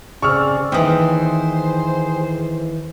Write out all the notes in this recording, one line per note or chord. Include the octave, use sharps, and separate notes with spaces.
C#3 C4 G#4 D5 C#6 E6 F6
D#2 E3 G#4 C5 G5 D#6